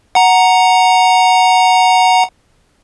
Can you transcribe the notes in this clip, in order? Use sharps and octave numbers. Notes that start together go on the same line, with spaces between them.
F#5 A#5